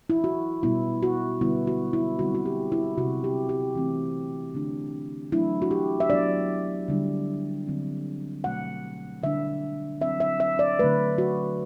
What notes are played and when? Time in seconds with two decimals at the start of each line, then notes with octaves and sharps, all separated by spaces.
0.10 E4
0.24 F#4
0.63 B2 G3 B3 E4
1.03 F#4
1.41 D3 G3 B3 E4
1.67 F#4
1.93 E4
2.19 D3 G3 C4 F#4
2.35 F#4
2.46 G4
2.72 E4
2.97 C3 F#3 C4 F#4
3.24 G4
3.49 G4
3.75 E3 A3 C4
4.54 D3 A3 D4
5.32 F#3 A3 D4 E4
5.62 F#4
5.71 G4
6.00 E5
6.10 F#3 B3 D4 D5
6.88 D3 G3 D4
7.67 D3 F#3 C4
8.44 B2 F#3 A3 F#5
9.23 D3 G3 D4 E5
10.01 F#3 C4 E5
10.20 E5
10.40 E5
10.59 D5
10.79 D3 F#3 A3 B4
11.18 F#4